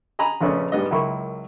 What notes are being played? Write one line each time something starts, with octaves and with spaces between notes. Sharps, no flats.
D#5 G#5 A#5 B5
F2 A#2 C#3 A3 B3 C#4
G#2 G3 B3 D#5
C#2 F#2 A#3 E4 B5 C#6